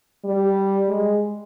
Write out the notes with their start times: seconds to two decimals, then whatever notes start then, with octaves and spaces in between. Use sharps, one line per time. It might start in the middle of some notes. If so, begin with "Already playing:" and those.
0.25 G3
0.89 G#3